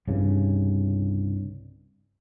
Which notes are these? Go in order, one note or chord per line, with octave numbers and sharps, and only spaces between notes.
C2 G2 C#3